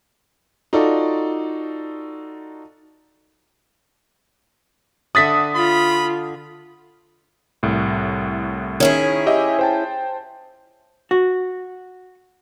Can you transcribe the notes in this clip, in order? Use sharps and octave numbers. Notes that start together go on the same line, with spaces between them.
D#4 F4 F#4 A4 D5
D3 E5 F#5 D#6 A6 B6
F4 B5
C2 A2
D#3 C#4 E4 G#4
G4 D#5 E5
C5 G5 A5
F#4